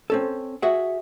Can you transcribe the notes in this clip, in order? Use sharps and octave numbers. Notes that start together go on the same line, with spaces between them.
C4 C#4 A4
F#4 G#4 E5 F#5